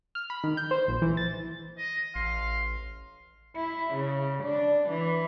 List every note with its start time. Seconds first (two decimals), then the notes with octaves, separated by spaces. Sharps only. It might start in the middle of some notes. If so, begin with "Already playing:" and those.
0.15 F6
0.30 B5
0.44 D#3
0.57 G6
0.71 C5
0.88 A#1
1.02 E3
1.17 A6
1.78 D#5
2.16 A1 F5 C6
3.56 E4
3.94 C#3
4.43 D4
4.89 E3